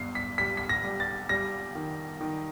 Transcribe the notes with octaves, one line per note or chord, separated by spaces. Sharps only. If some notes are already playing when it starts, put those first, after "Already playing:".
Already playing: G1 G2 C7
B6
G3 B6
B6
A#6
G3
A6
G3 A#6
D#3
D#3